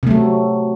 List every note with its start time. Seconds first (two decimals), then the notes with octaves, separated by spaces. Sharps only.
0.03 C3
0.07 A3
0.11 F#3